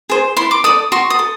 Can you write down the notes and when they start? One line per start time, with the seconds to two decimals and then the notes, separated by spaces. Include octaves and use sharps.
0.10 G#4 C5
0.37 E4 C6
0.51 D6
0.64 A4 D5 D#6
0.92 F#4 C6
1.10 D#6
1.19 A4